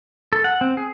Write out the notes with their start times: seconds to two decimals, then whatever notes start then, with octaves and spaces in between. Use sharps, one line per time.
0.33 A4
0.44 F#5
0.61 C4
0.77 G#4